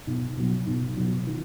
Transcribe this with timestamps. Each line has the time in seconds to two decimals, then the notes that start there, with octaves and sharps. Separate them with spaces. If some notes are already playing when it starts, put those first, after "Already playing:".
0.07 B1
0.37 B2 F#3
0.67 B1
0.97 B2 F#3
1.27 D#3